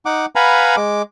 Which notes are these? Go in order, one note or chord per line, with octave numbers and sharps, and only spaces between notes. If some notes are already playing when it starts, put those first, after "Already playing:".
D#4 F#5 D6
B4 F5 F#5 G#5 A#5 B5
G#3 D6